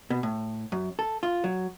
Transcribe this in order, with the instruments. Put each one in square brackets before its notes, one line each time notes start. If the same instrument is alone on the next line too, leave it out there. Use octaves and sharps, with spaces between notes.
[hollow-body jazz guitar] B2
A2
F#2
A4
F4
F#3